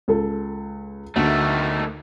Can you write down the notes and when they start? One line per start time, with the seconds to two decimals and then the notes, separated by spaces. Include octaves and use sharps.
0.08 C#2 A4
1.16 D2 D#3 A3